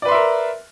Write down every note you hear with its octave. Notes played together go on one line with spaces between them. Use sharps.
A#4 B4 D5 E5 C6